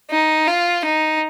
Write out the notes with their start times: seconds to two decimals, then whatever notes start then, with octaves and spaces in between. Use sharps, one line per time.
0.11 D#4
0.48 F4
0.85 D#4